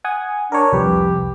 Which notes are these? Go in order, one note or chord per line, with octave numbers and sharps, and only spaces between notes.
F#5 G#5 D#6
D4 A#4 C#5
C2 F2 G4 B4